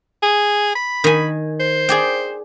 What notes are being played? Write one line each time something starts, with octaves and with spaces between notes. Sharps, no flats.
G#4
B5
D#3 G#5
C5
G#4 D5 G5